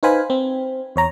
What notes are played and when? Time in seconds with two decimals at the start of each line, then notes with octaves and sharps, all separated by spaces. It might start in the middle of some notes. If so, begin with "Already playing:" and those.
0.03 D#4 B4 C5 F5 G#5 B5
0.30 C4
0.96 E2 C#5 A#5